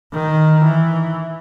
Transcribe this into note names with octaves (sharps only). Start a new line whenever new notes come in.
D#3
E3